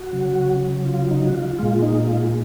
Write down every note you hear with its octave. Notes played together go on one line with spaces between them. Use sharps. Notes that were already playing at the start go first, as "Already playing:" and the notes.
Already playing: F#4
C#3 F#3
F4
D#4
F#4
F4
A#2 G#3 F4
D#4
F4